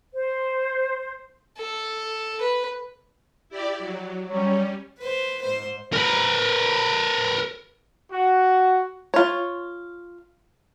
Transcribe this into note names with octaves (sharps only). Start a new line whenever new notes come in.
C5
A4
B4
E4 G4 D5
F#3
F#3 G3 C#4
B4 C5
G#2 C5
A#4 B4
F#4
F4 C#5